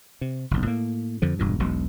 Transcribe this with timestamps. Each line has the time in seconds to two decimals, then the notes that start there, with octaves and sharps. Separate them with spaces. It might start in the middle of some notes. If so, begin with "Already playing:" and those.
0.21 C3
0.51 F#1 B1
0.66 A2 A#3
1.22 F2 D3 F3
1.39 E1 G2 A#2
1.59 E1 B1 B2